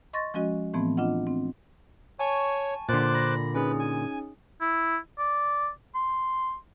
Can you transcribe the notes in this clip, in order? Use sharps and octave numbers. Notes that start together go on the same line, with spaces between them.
D#5 C6 C#6 A6 A#6
F3 G#3 C#4 F#4 D#5
A2 E3 F3 A3 B3 C4
D4 F4 D#5 F#5
C4
C#5 G#5 A5 C#6
A#2 D3 C5 D6 F#6 A6
B5 A#6
C#4 D#4 G#4 B4
G#5
E4
D5
C6